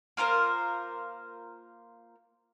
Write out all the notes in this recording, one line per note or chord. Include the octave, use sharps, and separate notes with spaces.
A#3 F4 A#4 C5